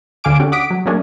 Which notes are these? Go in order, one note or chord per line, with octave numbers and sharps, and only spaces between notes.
D2 D3 F5 G#5 D6 D7
C#4 D4 F#4 G4 A4
F#5 D6 D#6 B6 D7
F#3
F#3 A3 A#3 C#4 D4 G#4